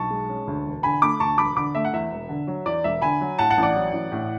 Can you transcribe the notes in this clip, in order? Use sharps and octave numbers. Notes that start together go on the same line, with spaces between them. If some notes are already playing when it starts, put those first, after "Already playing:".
Already playing: B1 A5 C#6
G#3
C#4
D2
E1
D3 G#5 B5
A3 B5 D6
D2 A5 C#6
E1 B5 D6
D3 B5 D6
A3 E5
F#5
E2 E5
E1
D3
F#3
E2 D5
E1 E5
D3 G#5 B5
F#3
A2 F#5 A5
F#5 A5
A1
D5 F#5
F#3
A1
A2